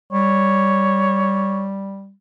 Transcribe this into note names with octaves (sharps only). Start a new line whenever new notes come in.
G3 C#5